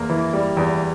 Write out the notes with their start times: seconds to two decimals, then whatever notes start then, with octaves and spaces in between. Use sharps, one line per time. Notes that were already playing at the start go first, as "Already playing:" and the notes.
Already playing: E2 A#3
0.09 E3
0.33 G3
0.57 E2